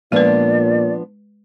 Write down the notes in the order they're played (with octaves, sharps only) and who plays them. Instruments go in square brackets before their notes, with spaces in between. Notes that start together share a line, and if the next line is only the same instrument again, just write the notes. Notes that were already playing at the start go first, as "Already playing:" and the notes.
[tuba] A#2 [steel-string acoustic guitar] F3 B3 D4 [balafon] G#3 B4 [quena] D5